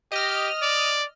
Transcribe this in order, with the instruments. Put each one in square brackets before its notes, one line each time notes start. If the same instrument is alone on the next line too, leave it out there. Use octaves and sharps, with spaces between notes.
[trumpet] G4 [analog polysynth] D#5 F6
[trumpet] D5